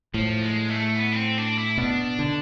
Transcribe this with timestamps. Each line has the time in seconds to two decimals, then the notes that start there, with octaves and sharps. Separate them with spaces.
0.14 A2 F3
0.42 G#3
0.70 A3
0.96 B3
1.12 D4
1.16 C4
1.38 D4
1.58 E4
1.78 B2 D4
2.19 D3